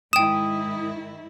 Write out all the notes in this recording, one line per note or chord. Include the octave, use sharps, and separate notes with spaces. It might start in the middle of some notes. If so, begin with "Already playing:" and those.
G#2 D#3 E4 G5 D#6 E7